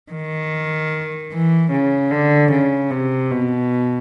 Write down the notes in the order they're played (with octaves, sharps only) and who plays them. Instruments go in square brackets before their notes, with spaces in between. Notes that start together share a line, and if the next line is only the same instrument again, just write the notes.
[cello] D#3
E3
C#3
D3
C#3
C3
B2